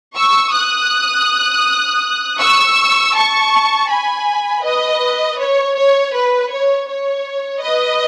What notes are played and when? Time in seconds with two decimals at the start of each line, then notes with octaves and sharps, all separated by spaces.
0.15 C#6 E6
0.53 D#6 F#6
2.39 C#6 E6
3.14 A5 C#6
3.88 G#5 B5
4.63 B4 D#5
5.38 C#5
5.75 C#5
6.12 B4
6.49 C#5
6.87 C#5
7.61 B4 D#5